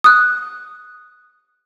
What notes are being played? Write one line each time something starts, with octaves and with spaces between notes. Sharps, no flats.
D#6 F#6